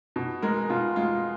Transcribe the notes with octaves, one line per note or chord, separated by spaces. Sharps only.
B2
G#3 A#4
B2 F4
G#3 F4